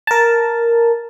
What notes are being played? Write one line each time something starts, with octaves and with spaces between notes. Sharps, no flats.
A#4 A5